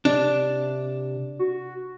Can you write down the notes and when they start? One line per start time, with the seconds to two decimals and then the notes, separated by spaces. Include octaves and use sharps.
0.05 C3 D4
1.39 F#4